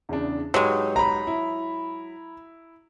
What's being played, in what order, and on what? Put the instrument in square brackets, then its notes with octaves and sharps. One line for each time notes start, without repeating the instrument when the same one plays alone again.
[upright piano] E2 C#3 D4
[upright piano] G#2 G4 B4 [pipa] F#3 G#3
[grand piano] A#5 B5
[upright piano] E4